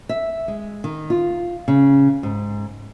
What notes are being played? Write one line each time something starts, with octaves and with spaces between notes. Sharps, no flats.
E5
G#3
D#3
F4
C#3
G#2